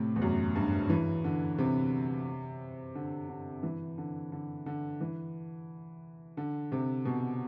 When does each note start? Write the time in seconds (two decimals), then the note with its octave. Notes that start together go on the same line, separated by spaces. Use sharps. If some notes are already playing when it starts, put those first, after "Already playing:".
Already playing: A2 C3
0.16 E2
0.22 F#2
0.56 G2
0.89 E3
1.24 D3
1.58 C3
2.95 D3
3.29 D3
3.63 E3
3.98 D3
4.32 D3
4.66 D3
5.01 E3
6.37 D3
6.72 C3
7.05 B2